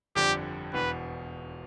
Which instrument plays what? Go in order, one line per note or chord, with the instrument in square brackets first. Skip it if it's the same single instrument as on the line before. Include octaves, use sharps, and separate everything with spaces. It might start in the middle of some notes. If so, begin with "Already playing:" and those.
[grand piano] G1 F2 D3 G3 D4 [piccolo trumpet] G4
[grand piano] E1 E2 B2 [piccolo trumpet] B4